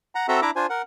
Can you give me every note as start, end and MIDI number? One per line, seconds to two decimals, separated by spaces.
0.15 0.27 78
0.15 0.27 82
0.28 0.41 60
0.28 0.41 66
0.28 0.41 69
0.28 0.41 76
0.28 0.41 82
0.42 0.51 62
0.42 0.51 64
0.42 0.51 76
0.42 0.51 82
0.42 0.51 86
0.56 0.66 62
0.56 0.66 65
0.56 0.66 72
0.56 0.66 80
0.70 0.82 70
0.70 0.82 78